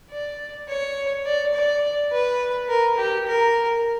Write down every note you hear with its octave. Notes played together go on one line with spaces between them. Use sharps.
D5
C#5
D5
D5
B4
A#4
G4
A#4